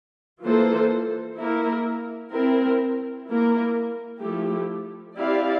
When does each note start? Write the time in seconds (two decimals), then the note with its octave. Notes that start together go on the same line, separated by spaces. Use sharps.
0.44 E3 A#3 F4 A4 C5
1.38 A#3 E4 A#4
2.33 C4 E4 A#4
3.28 A#3 E4 A#4
4.22 F3 A3 E4 G4
5.17 C4 E4 G4 D5 F5